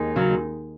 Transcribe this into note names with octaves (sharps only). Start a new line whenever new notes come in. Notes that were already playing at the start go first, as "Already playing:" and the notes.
Already playing: D#2 D#3 G#3 D#4
C#3 F#3